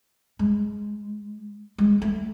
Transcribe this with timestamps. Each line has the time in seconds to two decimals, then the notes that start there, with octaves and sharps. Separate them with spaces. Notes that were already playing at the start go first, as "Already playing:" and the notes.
0.39 G#3
1.78 G#3
2.02 A3